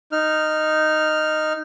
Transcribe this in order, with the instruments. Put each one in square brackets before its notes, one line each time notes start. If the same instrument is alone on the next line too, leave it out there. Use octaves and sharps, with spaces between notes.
[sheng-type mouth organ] D#4 F6